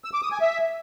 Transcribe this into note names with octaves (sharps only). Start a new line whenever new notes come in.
E6
D6
D#6
G#5
E5